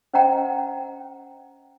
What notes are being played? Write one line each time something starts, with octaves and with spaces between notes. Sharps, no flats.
C#4 C5 D#5 F#5 G5 A#5